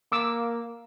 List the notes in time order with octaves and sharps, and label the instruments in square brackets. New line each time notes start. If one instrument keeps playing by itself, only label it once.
[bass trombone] A#3 [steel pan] D6 E6